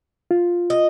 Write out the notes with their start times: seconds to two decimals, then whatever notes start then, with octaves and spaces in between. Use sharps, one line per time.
0.31 F4
0.70 D#5